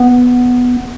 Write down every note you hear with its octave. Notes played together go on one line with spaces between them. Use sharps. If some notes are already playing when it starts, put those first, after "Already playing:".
Already playing: B3